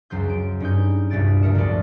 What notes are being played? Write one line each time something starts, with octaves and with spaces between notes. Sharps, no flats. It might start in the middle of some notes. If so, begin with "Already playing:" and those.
C#2 F#2 F#3 C5 G6
D7
G2 C#4 D#4 G6
C2 G2 A#2 F#4 A6 D7
F#1 A3 A#4 C#7 E7
D2 A2 F3 B3 D5 C6